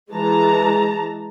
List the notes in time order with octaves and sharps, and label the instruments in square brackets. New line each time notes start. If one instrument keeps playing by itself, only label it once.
[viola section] E3 G#3 A5 A#5